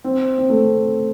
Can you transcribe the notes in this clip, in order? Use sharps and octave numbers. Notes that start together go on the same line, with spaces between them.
C4
C4
A3